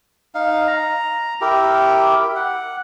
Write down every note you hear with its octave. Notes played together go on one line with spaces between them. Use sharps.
D#4 F5
A#5
E4 G4 A#4
F#5